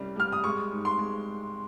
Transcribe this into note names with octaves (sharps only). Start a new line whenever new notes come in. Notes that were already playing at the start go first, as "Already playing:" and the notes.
Already playing: C2 G3 C#4
G3 F6
D#6
G#3 C#6
G#2
C6
G#3